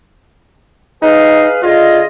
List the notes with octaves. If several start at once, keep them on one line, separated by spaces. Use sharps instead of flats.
D#4 G#4 B4 F5
D3 F4 G#4 D#5